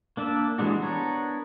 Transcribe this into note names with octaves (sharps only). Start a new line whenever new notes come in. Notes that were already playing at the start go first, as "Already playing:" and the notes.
A#3 D4 D5 E5
E3 G3 G#3 D4 F#4
B3 D4 A#4 C#5